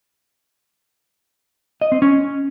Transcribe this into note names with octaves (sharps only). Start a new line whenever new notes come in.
D#5
C4
C#4